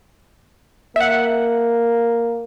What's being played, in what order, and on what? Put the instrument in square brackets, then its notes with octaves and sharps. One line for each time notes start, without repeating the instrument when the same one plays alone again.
[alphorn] A#3 [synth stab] E5 F#5